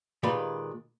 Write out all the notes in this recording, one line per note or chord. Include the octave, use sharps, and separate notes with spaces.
A#2 D#3 G#3 G4 B4 B5